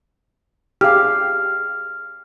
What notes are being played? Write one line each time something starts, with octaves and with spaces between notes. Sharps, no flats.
G4 G#4 F5 F6